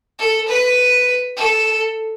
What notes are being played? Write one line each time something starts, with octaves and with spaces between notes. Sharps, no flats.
A4
B4
A4